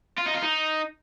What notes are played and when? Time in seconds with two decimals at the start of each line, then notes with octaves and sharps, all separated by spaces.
0.18 F4
0.26 D#4
0.35 F4
0.43 D#4